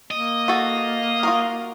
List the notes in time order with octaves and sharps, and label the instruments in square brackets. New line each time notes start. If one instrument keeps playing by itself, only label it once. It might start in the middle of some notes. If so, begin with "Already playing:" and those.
[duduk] A#3 [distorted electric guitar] D#5
[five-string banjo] F#4 A4 [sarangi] F5
[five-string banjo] F4 F#4 A#4